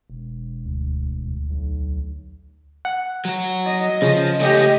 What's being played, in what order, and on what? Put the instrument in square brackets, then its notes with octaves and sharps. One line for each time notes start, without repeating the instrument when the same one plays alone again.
[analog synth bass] E1
[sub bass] D2
D2
[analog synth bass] B1
[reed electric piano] F#5
[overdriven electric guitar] F#3 F#4
[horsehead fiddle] D#5
[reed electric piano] C#3 [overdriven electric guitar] F3
[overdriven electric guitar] A3 C#4 [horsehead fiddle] G4 D#5